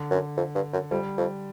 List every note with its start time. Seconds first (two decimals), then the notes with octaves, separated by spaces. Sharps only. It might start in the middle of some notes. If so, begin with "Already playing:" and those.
Already playing: D3
0.11 F#2
0.37 F2
0.55 G2
0.73 F#2
0.91 F2 G3
1.18 F2